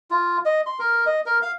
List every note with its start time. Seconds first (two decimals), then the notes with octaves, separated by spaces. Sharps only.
0.11 F4
0.45 D#5
0.66 C6
0.79 A#4
1.06 D#5
1.26 A#4
1.42 F5